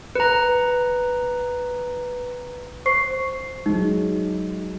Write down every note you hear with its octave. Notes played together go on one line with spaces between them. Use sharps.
B4 A#5
C5 C#6 C7
F#3 G#3 D#4